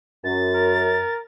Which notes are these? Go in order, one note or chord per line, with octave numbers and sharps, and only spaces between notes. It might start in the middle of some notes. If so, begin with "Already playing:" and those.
F#2 A6
A#4